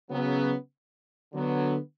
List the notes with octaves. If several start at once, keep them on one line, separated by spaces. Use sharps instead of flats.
C#3 F#3 B3
D3 F#3 B3